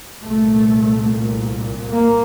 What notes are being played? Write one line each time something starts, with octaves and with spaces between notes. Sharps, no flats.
C2 A#2 A3
A#3